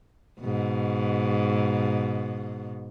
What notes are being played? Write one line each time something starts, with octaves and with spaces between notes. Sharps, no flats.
G#2 B2